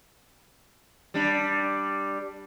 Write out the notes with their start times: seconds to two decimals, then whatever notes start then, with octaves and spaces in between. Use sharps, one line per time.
1.14 G3 D4